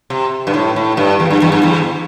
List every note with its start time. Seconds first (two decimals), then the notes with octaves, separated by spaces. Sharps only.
0.10 C3
0.47 G2
0.54 A2
0.76 A2
0.97 G2
1.20 E2
1.30 G2
1.42 E2
1.52 G2
1.63 E2